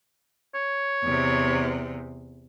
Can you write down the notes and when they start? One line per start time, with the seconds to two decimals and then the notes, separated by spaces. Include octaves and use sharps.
0.55 C#5
1.04 E2 C3